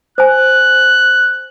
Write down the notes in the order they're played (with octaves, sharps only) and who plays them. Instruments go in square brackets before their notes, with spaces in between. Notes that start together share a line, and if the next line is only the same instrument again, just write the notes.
[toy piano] C5 G#5 [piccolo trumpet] F#6